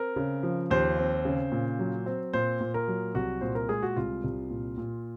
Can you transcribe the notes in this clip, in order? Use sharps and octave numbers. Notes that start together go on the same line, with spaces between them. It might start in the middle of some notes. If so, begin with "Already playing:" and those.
Already playing: C4 A#4
C#3
F3
D#2 C5
C4
C#3
A#2
F#3
C4
A#2 C5
A#2
A#4
F#3
C2 F#4
A#2 C5
A#4
G#3 G#4
F#4
C2 F4
C2
A#2
A#2